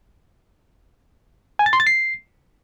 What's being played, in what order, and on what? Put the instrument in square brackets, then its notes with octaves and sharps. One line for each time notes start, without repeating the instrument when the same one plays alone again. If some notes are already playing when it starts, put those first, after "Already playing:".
[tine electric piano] G#5
A6
C6
A6
C7